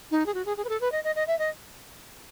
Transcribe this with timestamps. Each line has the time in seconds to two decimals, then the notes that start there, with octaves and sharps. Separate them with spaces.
0.11 D#4
0.26 G#4
0.34 F#4
0.46 G#4
0.57 G#4
0.65 B4
0.69 A4
0.81 B4
0.92 D#5
1.04 D#5
1.16 D#5
1.27 E5
1.39 D#5